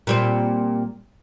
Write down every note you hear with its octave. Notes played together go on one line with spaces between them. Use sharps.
A#2 G3 C4